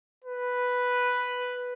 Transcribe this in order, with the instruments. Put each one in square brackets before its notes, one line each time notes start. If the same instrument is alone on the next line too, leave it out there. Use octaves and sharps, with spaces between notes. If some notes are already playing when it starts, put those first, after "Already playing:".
[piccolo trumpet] B4